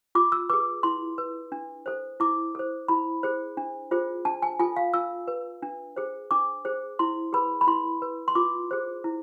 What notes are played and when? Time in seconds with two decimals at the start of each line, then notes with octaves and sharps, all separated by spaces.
0.15 F4 D6
0.32 E6
0.50 G#4 B4 D6
0.83 E4 C6
1.18 B4
1.52 D4
1.86 A4 C5
2.20 E4 D6
2.55 A4 C5
2.88 E4 B5
3.23 G#4 C5
3.57 D4
3.91 F4 G#4 C5
4.25 D4 A5
4.42 G#5
4.59 F4 A4 G#5
4.76 F5
4.94 F4 E6
5.28 B4
5.62 D4
5.96 G#4 C5
6.31 D4 D6
6.65 G#4 C5
6.99 E4 C6
7.33 G#4 B4 B5
7.61 B5
7.67 E4 C6
8.02 B4
8.28 C6
8.35 F4 D6
8.71 G#4 C5
9.04 E4